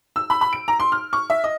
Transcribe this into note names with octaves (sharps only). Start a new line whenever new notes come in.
E6
B5
B5
D7
A#5
C6
F6
C#6
E5
D#5